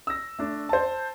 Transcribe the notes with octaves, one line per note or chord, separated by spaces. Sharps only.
E6 A#6
A3 D4
C5 A5